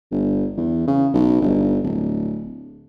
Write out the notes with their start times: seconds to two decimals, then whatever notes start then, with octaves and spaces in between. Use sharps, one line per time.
0.11 G1
0.57 E2
0.88 C#3
1.14 B1
1.42 G1
1.84 D1